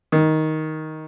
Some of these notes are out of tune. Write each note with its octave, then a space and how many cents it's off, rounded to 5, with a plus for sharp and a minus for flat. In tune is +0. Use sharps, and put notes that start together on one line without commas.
D#3 +10